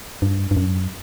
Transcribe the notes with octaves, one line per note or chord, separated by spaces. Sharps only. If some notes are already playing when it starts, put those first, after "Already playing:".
G2
G2
F#2